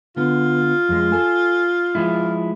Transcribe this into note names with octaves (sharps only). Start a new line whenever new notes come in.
D3 B3 F4
F2 G#3
A4 G#5
F3 G#3 E4